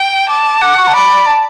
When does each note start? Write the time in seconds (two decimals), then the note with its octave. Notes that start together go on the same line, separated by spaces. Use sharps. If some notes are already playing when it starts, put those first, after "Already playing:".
Already playing: G5
0.28 A5 D6
0.61 F#5 D6
0.78 C#6
0.87 A5
0.94 D5 B5
1.26 A5